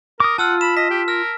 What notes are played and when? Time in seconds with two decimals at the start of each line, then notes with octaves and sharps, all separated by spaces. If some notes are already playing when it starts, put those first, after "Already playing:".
0.20 A#4 D6 D#6
0.38 F4 F#5 A5 E6 F6
0.61 B5 E7
0.77 D#5 B6
0.90 G4
1.08 A#4 F6